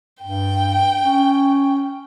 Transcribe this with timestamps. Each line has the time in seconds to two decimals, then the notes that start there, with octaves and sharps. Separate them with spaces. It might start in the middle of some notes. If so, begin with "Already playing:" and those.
0.22 G2 G5
1.03 C#4